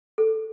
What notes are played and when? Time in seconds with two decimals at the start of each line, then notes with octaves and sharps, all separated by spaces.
0.18 A4